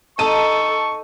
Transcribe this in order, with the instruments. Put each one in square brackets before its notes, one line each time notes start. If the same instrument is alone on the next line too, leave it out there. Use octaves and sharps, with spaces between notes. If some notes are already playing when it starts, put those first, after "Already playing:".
[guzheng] D#4 [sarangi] A4 [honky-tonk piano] A5 D#7 [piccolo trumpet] C#6